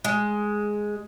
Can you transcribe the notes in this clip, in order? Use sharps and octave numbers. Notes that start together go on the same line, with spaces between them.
G#3